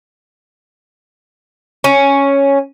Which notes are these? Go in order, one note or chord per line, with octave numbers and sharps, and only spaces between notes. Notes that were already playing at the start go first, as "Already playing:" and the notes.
C#4